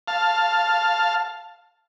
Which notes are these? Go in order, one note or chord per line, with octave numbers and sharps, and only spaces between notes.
F5 A5